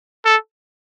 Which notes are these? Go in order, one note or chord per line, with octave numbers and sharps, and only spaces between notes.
A4